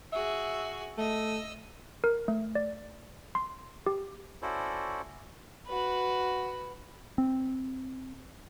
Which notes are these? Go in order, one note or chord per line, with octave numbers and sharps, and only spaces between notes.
F#4 G#4 E5
A3 D#5 E6
A#4
A3
D5
C6
G4
C#4 E4 F#4 A4 C5 D5
F#4 B4
C4